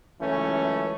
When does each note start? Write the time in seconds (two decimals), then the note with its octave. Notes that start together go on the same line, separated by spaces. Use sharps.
0.21 C#2 F#2 E3 A3 C#4